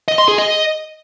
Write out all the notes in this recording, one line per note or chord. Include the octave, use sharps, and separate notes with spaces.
D#5
C6
G#4
D#5